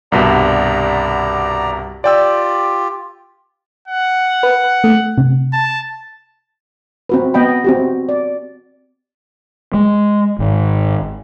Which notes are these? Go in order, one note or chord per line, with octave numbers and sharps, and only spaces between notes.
C2 G2 B2 D5 A#5
F4 G4 D5 G5 E6
F#5
B4
A3
C3
A5
C4 F#4 B4
B3 D#5 G5 B5
C4 F#4 G4
D5
G#3
G#1